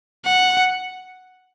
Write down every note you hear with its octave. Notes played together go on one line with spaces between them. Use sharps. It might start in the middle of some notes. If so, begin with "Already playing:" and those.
F#5